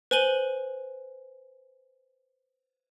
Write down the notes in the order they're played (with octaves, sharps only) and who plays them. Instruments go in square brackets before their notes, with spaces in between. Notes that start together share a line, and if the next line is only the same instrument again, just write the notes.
[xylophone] B4 C5 G#5 D#7 F#7 G7